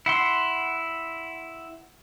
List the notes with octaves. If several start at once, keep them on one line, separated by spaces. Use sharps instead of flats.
E4 F#5 C6